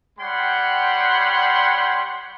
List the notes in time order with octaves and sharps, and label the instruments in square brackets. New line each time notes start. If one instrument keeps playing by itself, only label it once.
[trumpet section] G3 C#5 F#5 G5 B5 C6